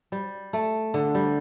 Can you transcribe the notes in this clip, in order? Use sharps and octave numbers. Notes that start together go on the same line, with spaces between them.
G3
A3
D3
G3